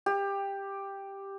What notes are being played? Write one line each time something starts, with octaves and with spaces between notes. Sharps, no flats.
G4